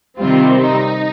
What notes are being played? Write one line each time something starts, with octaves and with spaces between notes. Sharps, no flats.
C3 D#3 G3 C4 F4
D#4